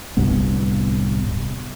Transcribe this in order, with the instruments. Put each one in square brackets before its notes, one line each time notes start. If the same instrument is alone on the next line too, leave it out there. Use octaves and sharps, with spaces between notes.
[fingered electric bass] D1 C2 G2 B3